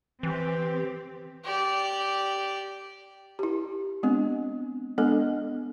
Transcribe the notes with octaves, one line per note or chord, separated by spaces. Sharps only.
E3 C4 G4
G4 D5
E4 G4
G#3 B3 C4 D4
G#3 B3 D4 A4